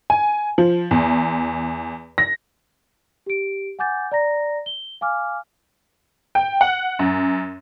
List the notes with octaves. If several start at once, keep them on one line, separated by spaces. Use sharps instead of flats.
G#5
F3
E2
A#6
G4 D7
F#5 G#5 D6 G6 A6
D5 A#5 A#6
G7
F5 G#5 D6 F6
G5
F#5
F#2